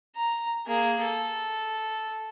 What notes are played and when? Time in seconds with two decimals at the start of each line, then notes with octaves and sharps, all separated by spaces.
0.16 A#5
0.67 A#3 G#4
1.02 A4